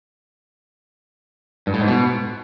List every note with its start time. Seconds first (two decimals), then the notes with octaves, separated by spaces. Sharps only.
1.67 G2
1.74 A2
1.81 G#2
1.88 B2